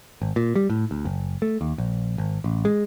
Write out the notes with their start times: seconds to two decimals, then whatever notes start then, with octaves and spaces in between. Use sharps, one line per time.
0.22 G#1
0.36 A#2
0.56 G3
0.70 A2
0.91 D2
1.05 F#1
1.42 A3
1.61 D#2
1.78 A#1
2.18 G#1
2.44 A1
2.65 G#3